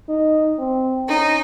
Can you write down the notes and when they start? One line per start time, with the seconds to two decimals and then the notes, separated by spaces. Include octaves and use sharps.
0.09 D#4
0.59 C4
1.08 C#4 D#4